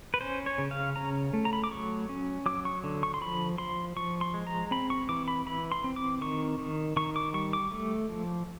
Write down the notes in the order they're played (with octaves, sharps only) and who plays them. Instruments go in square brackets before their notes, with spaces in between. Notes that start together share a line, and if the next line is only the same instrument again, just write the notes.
[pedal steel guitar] B4
C#4 C5
C#5
C#3
F5
C#4 A#5
A3
A#5
B5
D6
F#3 C#6
C#4
F#3 D6
C#6
D3
C#6
C6
F3 B5
F3 C6
F3 C#6
C6
G#3
A#5
C4 B5
C#6
E3 D6
B5
E3 B5
C6
C4
D6
D#3 C#6
D#3
D#3 C#6
D6
G3 C#6
D6
A3
F3